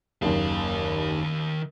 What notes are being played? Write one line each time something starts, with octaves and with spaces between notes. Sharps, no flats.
F#1 D#2 D#3 F5